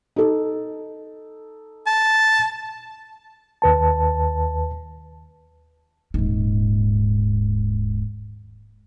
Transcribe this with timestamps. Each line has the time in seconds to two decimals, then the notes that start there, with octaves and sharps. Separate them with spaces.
0.16 D#4 A4
1.87 A5
3.62 D#2 B4 A5
6.14 D#1 G#2